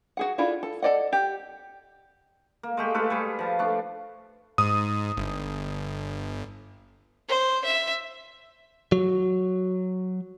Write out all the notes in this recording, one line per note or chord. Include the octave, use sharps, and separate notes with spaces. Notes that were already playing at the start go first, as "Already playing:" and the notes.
F#4 G#4 F#5
D4 E4 F4 G#4 A4
A4
A4 B4 D5 D#5 F#5
G4
A#3
G#3 A3 G4
A3 F4 A4 B4
G3 G#4 B4
F3 A5
A3 D4
G#2 D#6
G1
C5
E5
F#3